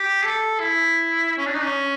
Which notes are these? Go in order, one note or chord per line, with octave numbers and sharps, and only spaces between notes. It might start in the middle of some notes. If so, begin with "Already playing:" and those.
Already playing: G4
A4
E4
C#4
D4
D#4
C#4